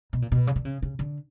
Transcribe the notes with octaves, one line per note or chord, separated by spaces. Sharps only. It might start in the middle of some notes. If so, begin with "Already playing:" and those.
B2
A#2
B2
C#3
D3
C#3
C#3
D3